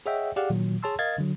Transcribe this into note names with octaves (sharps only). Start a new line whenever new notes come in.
G#4 C#5 D#5 E5 F#5 G5
G4 G#4 D5 F5 F#5
A#2 D#3 F#3
G#4 C#5 A5 C6 E6
A#4 D#5 F5 G#6 A6
D3 F#3